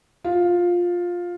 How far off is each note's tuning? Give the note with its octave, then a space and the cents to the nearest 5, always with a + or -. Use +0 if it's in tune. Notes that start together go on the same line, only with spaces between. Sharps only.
F4 +10